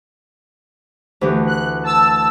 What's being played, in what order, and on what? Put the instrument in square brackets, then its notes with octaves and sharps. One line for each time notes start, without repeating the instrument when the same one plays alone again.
[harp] D2 E3 G4
[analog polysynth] F#6
A5 E6